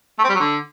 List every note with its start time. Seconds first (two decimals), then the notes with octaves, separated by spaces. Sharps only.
0.18 A3
0.24 C4
0.29 G3
0.35 F#3
0.40 D3